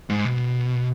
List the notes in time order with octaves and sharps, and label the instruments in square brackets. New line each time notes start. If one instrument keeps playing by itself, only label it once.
[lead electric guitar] G#2
B2